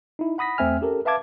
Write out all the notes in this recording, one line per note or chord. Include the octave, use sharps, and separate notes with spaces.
D#4 E4
F#5 B5 D#6 A#6 B6
E2 A3 C4 E5 G#5 F6
C#4 G4 A4 A#4
B4 E5 F5 A5 D6 G#6